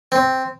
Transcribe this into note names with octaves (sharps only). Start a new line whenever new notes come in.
C4